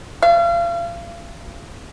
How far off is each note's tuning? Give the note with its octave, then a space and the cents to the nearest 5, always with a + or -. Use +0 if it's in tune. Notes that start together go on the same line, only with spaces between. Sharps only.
F5 -35